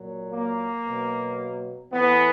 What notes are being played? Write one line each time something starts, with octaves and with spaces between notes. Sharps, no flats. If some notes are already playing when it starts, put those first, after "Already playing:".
Already playing: A#2 F#3
A#3
B2 F#3
A2 E3 B3